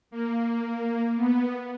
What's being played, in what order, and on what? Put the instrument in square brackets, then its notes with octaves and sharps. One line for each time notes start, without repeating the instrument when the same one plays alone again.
[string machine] A#3
B3